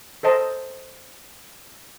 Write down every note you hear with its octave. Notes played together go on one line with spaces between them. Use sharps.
A4 C5 D#5 A5